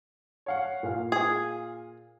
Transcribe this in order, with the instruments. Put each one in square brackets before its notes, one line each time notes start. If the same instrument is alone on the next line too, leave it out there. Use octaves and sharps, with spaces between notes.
[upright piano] C#5 F5 F#5
A#2 F5
[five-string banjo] G#4